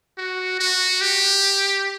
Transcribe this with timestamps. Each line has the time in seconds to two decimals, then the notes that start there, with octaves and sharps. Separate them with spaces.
0.18 F#4
0.59 F#4
1.01 G4